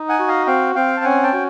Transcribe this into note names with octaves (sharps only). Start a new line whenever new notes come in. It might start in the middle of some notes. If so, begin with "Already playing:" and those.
Already playing: D#4
F#5 G#5
F#4
D#5 F5
C4 F5 G5
C4 F5 G5
A5
C#4 F#5 G#5
G5 A5
F#4